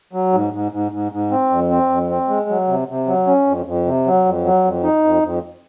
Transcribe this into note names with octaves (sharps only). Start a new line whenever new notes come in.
F#3
G#2
G#2
G#2
G#2
G#2
C4
F2
C4
F2
C4
G#3
F#3
C3
C3
F#3
C#4
F2
F2
C3
F#3
F2
F#3
F2
D#4
F2
F2